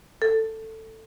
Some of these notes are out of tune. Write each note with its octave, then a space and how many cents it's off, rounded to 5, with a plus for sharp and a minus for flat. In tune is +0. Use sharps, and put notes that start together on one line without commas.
A4 +10